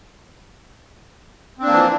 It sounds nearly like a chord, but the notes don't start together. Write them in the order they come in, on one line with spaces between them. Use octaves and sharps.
C4 D4 A#3 E3 F3